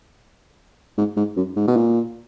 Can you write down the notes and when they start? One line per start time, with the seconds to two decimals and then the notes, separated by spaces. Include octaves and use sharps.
0.98 G#2
1.17 G#2
1.37 F#2
1.56 G#2
1.67 B2
1.76 A#2